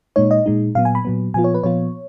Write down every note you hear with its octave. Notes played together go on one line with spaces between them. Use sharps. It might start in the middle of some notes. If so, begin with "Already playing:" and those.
A#2 G#3 D#4 C#5
D#5
A#2 G#3 D#4
A#2 F#3 B3 F5
G#5
B5
A#2 F#3 B3
A#2 F3 B3 F4 G#5
C#5
B4
A#2 F3 B3 F4 C#5